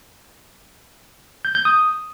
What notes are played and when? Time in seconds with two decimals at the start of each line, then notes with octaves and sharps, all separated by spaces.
1.45 G6
1.55 G6
1.65 D#6